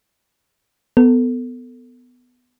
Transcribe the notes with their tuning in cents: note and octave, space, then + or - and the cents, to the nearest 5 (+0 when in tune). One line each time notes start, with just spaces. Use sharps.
B3 +10 A4 +20